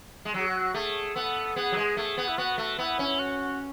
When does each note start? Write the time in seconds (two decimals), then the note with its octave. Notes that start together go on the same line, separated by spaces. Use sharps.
0.25 G#3
0.34 F#3 G#4
0.47 F#4
0.74 A3 G#4
1.15 B3 A4
1.56 B3 G#4
1.72 F#3
1.77 G#3
1.97 A3 G#4
2.18 B3
2.28 E4
2.38 B3 F#4
2.58 A3
2.78 B3 E4
2.99 C#4
3.19 F#4